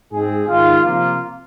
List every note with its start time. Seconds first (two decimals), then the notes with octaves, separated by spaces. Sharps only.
0.12 G#2 G#3 C4 G#4
0.47 G#2 D#3 G#3 F4
0.83 C3 F3 A#3 F4